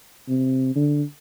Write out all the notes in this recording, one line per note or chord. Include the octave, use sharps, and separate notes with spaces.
C3
D3